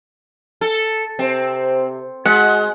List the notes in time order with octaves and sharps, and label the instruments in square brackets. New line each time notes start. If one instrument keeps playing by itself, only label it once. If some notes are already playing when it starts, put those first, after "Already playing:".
[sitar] A4
[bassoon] C3 [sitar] C4
[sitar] G#3 [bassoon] F#4 [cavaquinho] F#5